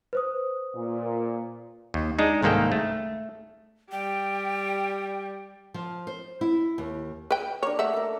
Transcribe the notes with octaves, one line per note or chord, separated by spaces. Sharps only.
B4 C5 D#6
A#2
D#2
G#3 D4 D#4
C2 G#2 D#3 A#3 A4 G5
A3
G3 G5
F3
C5
E4
D#2
B4 G5
A#3 D4 C#5
A3 E5 F#5
A4 A#4